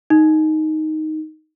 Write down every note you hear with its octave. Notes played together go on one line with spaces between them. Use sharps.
D#4